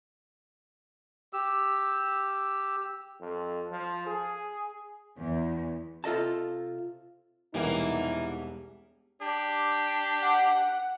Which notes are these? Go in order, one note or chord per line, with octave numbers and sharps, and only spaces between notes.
G4 E6
F2
F3
G#4
E2
C3 F4 A4 D#5 A5
E1 C2 E3 A#3 D#4 G4
D4 G4
F#5